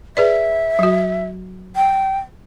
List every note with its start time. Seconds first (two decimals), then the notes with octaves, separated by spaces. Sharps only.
0.17 G#4 B4 D5 E5
0.79 F#3 F#4
1.76 G5